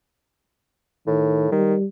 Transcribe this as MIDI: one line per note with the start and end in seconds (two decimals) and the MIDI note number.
1.07 1.48 45
1.07 1.48 51
1.52 1.75 51
1.52 1.85 55